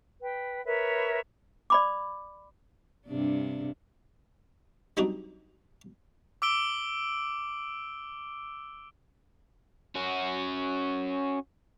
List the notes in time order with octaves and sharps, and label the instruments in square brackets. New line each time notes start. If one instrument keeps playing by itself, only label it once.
[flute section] B4 G5
A#4 B4 C#5 E5
[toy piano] D5 B5 D6
[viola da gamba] G2 C3 D4
[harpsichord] F#3 G3 C4 D4 D#4 F#4
[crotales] D6 E6 D7 G7
[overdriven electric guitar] C#4 F#4